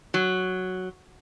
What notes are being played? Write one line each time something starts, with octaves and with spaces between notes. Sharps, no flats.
F#3